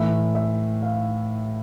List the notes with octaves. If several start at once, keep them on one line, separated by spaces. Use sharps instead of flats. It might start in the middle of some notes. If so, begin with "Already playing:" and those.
Already playing: A2 E3 E5
E5
F5